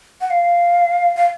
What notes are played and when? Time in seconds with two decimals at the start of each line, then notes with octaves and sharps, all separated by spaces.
0.21 F#5
0.30 F5
1.16 F5